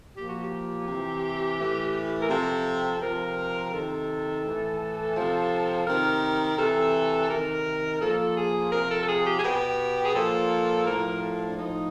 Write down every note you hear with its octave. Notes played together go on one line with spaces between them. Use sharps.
A#2 F3 G4
F#4
G4
C3 E3
A2 E3
A#4
C3 F3 A4
C3 F3 A#4
C3 D#3 A4
A2 E3
C3 F3
C3 D#3 A#4
C3 E3 A4
C3 D#3 A#4
A#2 F3 A4
G#4
C3 F3 A#4
A4
A4
G#4
G4
G#4
B2 G4
G#4
A#2 F3 A4
A2 F3 A#4
A4
D4
A2 F3 D#4